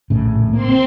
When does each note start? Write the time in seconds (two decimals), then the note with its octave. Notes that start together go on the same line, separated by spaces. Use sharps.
0.10 A#1 A2 C#3
0.53 A#3 C4 C6